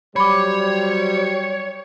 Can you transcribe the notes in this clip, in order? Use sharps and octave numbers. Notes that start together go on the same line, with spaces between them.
F#3 G3 C5 C#5 B5 D6